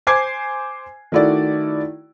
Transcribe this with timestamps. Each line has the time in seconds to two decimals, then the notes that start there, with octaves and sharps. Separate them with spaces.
0.07 C5 G#5 D6 G#6 C7
1.12 D#3 A3 E4 F#4 D5